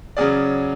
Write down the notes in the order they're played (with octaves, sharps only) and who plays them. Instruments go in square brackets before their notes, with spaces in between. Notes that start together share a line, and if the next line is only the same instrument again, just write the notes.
[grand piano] C#3 F#3 C#4 G#4 D5